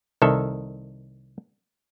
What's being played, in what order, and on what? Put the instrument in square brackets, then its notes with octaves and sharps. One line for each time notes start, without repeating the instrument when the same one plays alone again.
[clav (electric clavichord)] C2 D#3 A4 E5